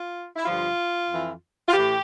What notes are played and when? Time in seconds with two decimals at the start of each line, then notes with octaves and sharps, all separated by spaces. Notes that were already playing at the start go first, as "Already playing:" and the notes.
Already playing: F4
0.36 E4
0.46 G2 D3 F3 F4
1.09 F2 E3
1.67 F4
1.72 A2 E3 G4